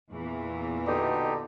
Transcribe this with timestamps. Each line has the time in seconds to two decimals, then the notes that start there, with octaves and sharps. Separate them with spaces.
0.11 E2 A#2 E3
0.87 B2 D3 D#4 G4